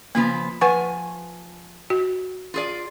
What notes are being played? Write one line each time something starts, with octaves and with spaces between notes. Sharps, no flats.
C#3 F3 A#3 B3
F3 B4 F#5 G#5 C#6
F#4
F4 G#4 D5